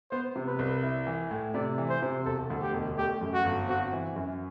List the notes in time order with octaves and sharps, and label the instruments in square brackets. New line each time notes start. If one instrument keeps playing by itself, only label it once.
[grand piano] B3 [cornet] C5
[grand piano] C3
[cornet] B4
[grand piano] C2
E4
E3
A2
[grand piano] C3 [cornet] D5
[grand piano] E3
[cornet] C5
[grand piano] C3
[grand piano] E1 [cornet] A4
[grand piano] D2
[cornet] G4
[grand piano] E1
[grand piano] A3 [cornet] G4
[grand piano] F#2
[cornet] F#4
[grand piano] G1
[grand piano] C4 [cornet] F#4
[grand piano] E3
F#2